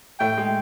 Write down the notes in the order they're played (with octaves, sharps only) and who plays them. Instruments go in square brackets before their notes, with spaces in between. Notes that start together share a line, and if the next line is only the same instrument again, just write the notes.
[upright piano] A2 A3 [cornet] G5
[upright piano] G#3